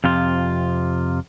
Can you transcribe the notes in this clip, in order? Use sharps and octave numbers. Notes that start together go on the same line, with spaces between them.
F2 C3 F4